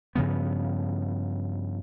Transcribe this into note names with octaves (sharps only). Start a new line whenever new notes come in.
G2 C#3 F3 B3